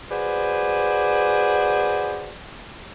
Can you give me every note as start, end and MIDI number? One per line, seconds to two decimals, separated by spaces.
0.11 2.35 66
0.11 2.35 68
0.11 2.35 71
0.11 2.35 72
0.11 2.35 74